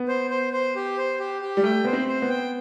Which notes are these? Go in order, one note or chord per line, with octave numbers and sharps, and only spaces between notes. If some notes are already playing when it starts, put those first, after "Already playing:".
Already playing: B3
C5
C5
C5
G4
C5
G4
G4
G3
A3 G5
B3 C5
C4
C5
B3
G5